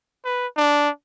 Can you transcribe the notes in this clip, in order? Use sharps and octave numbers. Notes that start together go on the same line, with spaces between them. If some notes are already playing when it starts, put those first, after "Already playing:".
B4
D4